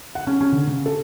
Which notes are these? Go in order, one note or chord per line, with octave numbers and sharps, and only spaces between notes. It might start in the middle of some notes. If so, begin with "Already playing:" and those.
F#5
C#4
C#4
D3
C#3
A4